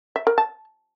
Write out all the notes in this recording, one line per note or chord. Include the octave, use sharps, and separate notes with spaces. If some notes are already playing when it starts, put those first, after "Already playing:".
E5
A#4
A5